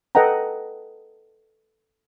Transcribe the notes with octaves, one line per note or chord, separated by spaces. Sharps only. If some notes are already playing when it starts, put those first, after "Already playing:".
A4 B4 D#5 F#5 G5 A#5